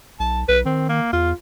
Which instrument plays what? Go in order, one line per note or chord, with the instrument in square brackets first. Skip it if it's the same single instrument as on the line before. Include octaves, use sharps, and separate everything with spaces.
[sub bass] B1 [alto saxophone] A5
[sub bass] B1 [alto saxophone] B4
[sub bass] D#3 [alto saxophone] C4
[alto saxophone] A#3
[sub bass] E2 [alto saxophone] F4